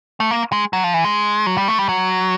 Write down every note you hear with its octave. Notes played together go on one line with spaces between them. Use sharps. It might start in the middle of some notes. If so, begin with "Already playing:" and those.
A3
A#3
G#3
F#3
F3
E3
G#3
F#3
G3
A3
G3
F#3